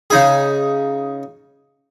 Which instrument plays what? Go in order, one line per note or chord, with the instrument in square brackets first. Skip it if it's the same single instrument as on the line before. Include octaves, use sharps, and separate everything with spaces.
[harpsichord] C#3 D#4 G#4